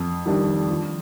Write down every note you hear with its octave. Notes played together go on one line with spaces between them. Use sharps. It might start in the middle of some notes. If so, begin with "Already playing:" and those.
Already playing: F2
D#3 G3 D4
F3